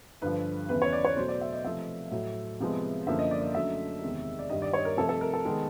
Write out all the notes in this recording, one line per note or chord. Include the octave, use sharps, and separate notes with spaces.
G2 D3 F3 B4
E2 C#3 E3 B4
C#5
D5
C#5
B2 F#3 A3 C5
D5
E5
D#5
C3 F3 A3 E5
A2 F#3 A3
C3 F3 G#3 B3
F#2 D3 F3 A#3 E5
D#5
D5
D#5
F#2 D3 F#3 A3 E5
E2 C3 D#3 G#3
D5
G2 D#3 G3 D#5
D5
C#5
A#4
C3 F3 A3 A4
A4
A#4
A4
D#3 G#3 B3